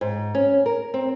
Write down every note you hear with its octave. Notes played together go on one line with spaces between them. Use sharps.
G#2
C#4
A#4
C4